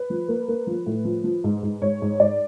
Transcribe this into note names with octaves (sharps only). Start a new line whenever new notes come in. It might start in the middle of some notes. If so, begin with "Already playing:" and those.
Already playing: B4
F3
A#3
A#3
F3
A2
F3
F3
G#2
G#2
G#2 C#5
G#2
G#2 D5